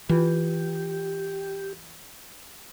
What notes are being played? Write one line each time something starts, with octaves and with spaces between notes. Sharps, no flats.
E3 F4 G4 B4